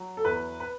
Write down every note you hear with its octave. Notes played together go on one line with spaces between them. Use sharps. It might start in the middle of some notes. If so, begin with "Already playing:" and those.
Already playing: F#3
A4
E2 B4
B4